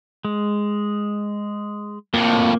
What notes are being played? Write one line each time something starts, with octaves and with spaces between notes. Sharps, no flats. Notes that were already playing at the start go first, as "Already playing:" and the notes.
G#3
F2 A2 A#3